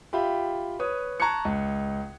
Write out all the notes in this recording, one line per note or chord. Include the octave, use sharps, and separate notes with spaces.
F4 G4 E5 G5 B5
B4 C#5 D#6
A5 A#5 C#6 F#6 G#6 C#7
C#2